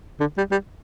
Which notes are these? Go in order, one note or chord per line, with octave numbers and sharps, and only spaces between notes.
D3
G3
G3